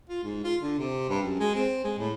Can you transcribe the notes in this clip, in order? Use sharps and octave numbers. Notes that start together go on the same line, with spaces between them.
F4
G#2
F4
D3
C3
G2
F#2
G#3
C4
G#3
A2